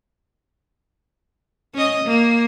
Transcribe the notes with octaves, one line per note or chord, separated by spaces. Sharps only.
C#4 D#5
A#3